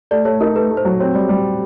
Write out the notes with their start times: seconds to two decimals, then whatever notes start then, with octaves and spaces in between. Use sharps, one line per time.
0.11 A3 D5
0.25 A3 C#5
0.41 D#4 A#4
0.56 A3 B4
0.70 A3
0.77 C5
0.85 F#3
1.00 C4 C#5
1.15 G3
1.29 G3